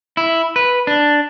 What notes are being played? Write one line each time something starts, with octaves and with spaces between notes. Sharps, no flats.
E4
B4
D4